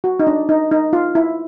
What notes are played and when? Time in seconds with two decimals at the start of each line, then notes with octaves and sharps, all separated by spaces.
0.04 F#4
0.20 D#4
0.27 D4
0.49 D#4
0.71 D#4
0.93 F4
1.15 E4